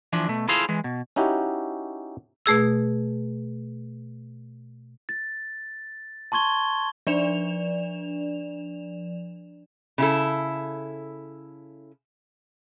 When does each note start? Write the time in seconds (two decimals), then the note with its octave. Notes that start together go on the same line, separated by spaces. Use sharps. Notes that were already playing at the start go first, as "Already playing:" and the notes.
0.13 E3 F3 D4
0.28 B2 A3
0.48 E4 F4 G#4 A4 C5 F5
0.69 E3 G#3
0.84 B2
1.16 C#4 D#4 E4 F#4 G4
2.46 B2 A3 G#4 E6
5.09 A6
6.32 A5 C6 C#6 G#6 G7
7.07 F3 D4 D5 E7 F7
9.98 C#3 E4 A4